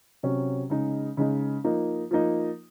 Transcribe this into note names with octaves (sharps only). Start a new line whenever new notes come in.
C3 F#3 C#4
C#3 G#3 D#4
C#3 G#3 D#4
F3 A#3 D#4
F3 A#3 D#4